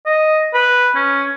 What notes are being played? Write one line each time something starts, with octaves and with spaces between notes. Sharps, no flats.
D#5
B4
C#4